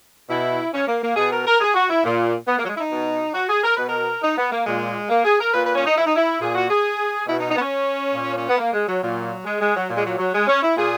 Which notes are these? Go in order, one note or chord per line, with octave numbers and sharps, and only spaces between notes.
B2 E4
C#4
A#3
A#3
B2 G#4
A#4
A#4
G#4
F#4
E4
A#2
B3
A#3
F#3
G#3
E4
D#4
B2
F#4
G#4
A#4
B2 B4
A#4
D#4
B3
A#3
A#2 G#3
A#3
G#4
A#4
A#2 B4
B4
C#4
D#4
E4
D#4
E4
A#2 G#4
F#4
G#4
B2 E4
D#4
D#4
B3
C#4
A#2
C#4
B3
A#3
G#3
F#3
A#2 F#3
G#3
G#3
F#3
A#2
G#3
F#3
F#3
G#3
C#4
E4
A#2 G#4